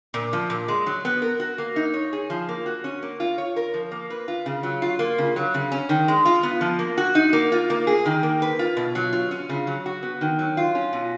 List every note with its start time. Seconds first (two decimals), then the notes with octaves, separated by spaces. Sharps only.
0.14 A#2
0.33 F3
0.50 A#2
0.68 G#3
0.86 F#3
1.05 B3
1.22 A#4
1.40 F#4
1.58 A#3
1.76 D#4
1.94 C#5
2.13 G#4
2.30 F3
2.49 A#3
2.66 F#4
2.84 C#4
3.02 A#3
3.20 F4
3.38 C#5
3.56 A#4
3.74 F3
3.92 A#3
4.10 B4
4.28 F4
4.46 C#3
4.63 F#3
4.82 F4
4.99 A#3
5.18 C#3
5.36 F#3
5.54 C#3
5.72 C#4
5.89 D#3
6.08 G#3
6.25 F4
6.43 B3
6.61 F3
6.79 A#3
6.97 F#4
7.15 D#4
7.33 A#3
7.52 F4
7.70 A#3
7.87 G#4
8.06 D#3
8.23 A#3
8.42 B4
8.59 F4
8.77 B2
8.95 F#3
9.13 F4
9.31 C#4
9.49 C#3
9.67 F#3
9.86 F#4
10.03 B3
10.21 D#3
10.39 F#3
10.57 F4
10.75 C#4
10.93 B2